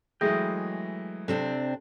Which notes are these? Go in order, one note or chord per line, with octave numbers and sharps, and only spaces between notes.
E3 F#3 G#3 A3 G#4 D#5 G5
C3 C4 D4 A4